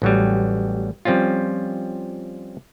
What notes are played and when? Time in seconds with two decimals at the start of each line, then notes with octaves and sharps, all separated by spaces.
0.02 A1 F#3 G3
1.05 F3 G3 C4 C#4 F4